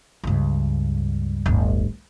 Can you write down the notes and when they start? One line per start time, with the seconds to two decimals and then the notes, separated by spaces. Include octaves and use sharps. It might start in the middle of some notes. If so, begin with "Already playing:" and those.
0.24 C#2 G2
1.46 D1 G1